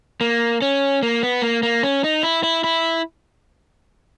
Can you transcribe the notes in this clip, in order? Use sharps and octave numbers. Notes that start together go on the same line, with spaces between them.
A#3
C#4
A#3
B3
A#3
A#3
C#4
D#4
E4
E4
E4